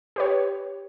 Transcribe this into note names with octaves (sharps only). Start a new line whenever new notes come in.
G4 B4 C#5